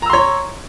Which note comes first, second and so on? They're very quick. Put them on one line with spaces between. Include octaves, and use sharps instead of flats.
A#5 E6 C6 C#5